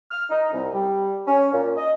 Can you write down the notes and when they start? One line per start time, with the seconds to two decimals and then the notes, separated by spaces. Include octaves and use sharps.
0.12 F6
0.30 D#4
0.53 C2
0.74 G3
1.27 C#4
1.52 A#2
1.77 D#5